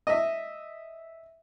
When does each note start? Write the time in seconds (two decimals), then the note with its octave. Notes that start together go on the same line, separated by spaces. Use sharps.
0.07 D#5 E5